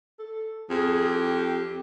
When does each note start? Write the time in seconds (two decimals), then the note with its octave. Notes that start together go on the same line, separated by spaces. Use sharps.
0.19 A4
0.70 F2 G#4
1.04 G4